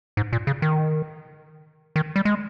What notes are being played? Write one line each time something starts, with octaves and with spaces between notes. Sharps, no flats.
G#2
A#2
C#3
D#3
D#3
G3
G#3